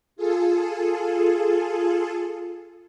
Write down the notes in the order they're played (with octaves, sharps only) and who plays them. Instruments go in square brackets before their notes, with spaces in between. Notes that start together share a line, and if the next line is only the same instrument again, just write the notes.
[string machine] F4 G#4 A4